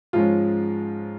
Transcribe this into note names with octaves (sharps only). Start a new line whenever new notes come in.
G#2 F3 G#3 C#4 F4